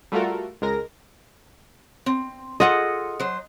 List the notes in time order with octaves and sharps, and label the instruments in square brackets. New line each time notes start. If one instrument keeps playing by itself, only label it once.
[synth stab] G3 A3 F4 F#4 A4 A#4
C#2 G#3 A#4 A#6
[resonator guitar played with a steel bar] C4
[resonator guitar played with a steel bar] F4 G#4 A4 [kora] D#5 F#5
[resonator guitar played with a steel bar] F#3 C5